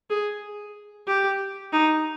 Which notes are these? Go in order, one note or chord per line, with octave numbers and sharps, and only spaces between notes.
G#4
G4
D#4